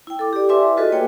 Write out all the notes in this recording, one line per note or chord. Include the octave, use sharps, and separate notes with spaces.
E4 G5
A4 D6
G4 D5
E4 B4 E5 G#5 C6 D6
F4 F#4 G#4 A4 B4 D#5
A#3 C#5 G5 G#5